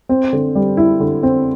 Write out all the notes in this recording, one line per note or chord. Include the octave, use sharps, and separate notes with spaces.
C4
D3
G3
E4
D3
C4